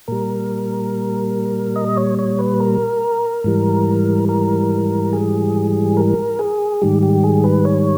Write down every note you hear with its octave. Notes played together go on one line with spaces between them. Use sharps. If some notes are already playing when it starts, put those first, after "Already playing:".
A#2 G3 A#4
D#5
C#5
C#5
B4
A#4
G#2 E3 G3
A#4
G#4
A#4
G#4
G#2 D#3 G3 G4
G4
G#4
B4
C#5